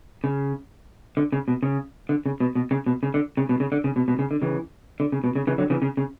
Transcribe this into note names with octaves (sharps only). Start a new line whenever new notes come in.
C#3
D3
C#3
B2
C#3
D3
C#3
B2
B2
C#3
B2
C#3
D3
C#3
B2
C#3
D3
C#3
B2
B2
C#3
D3
C#3 E3
D3
C#3
B2
C#3
C#3 E3
D3 F#3
C#3 E3
C#3
C#3